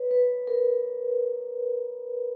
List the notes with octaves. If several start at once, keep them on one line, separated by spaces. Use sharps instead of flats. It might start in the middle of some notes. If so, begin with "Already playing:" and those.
Already playing: B4 C#5
B4
A#4